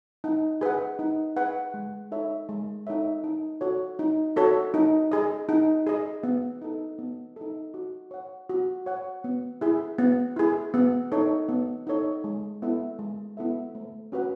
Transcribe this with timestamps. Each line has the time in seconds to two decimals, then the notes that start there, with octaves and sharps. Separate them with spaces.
0.24 D#4
0.61 G#4 B4 F#5
0.99 D#4
1.36 G#4 B4 F#5
1.74 G#3
2.11 D#4 A4 C#5 E5
2.49 G#3
2.87 D#4 A4 C#5 E5
3.24 D#4
3.61 F#4 A4 C#5
3.99 D#4
4.36 F#4 A4 C#5
4.74 D#4
5.12 G#4 D#5
5.49 D#4
5.87 G#4 D#5
6.23 B3
6.62 D#4 A4
6.99 B3
7.36 D#4 A4
7.74 F#4
8.11 C#5 F#5
8.49 F#4
8.86 C#5 F#5
9.24 B3
9.61 E4 G#4
9.98 B3
10.36 E4 G#4
10.74 B3
11.12 D#4 A4 C#5
11.49 B3
11.87 D#4 A4 C#5
12.24 G#3
12.62 B3 E4 A4 E5
12.99 G#3
13.37 B3 E4 A4 E5
13.75 A3
14.12 C#4 F#4 B4 F#5